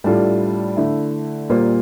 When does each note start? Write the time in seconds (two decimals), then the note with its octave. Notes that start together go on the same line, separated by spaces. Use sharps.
0.04 A2 G3 D4 F4 A4
0.77 D3 A3 E4
1.50 A#2 G3 A#3 F4 C5